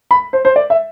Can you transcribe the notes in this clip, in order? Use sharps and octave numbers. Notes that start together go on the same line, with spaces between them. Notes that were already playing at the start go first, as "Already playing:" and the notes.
B5
C5
C5
D5
E5